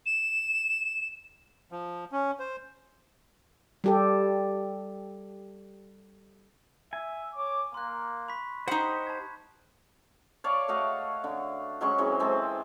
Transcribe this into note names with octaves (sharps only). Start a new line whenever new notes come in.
E7
F3
C#4
C5
G3 G4 A4
E5 G#5
C#5 D6
A#3 C6 F#6
B5 C#6 B6
D#4 G4 C5 D#5 F#5
A5 G#6
C#5 D5 F5 A5
A3 F#4 D#5 F5
D3
F#3 G#3 C#4 C#6
E3 F#3 G#3 C4
G#3 C4 A4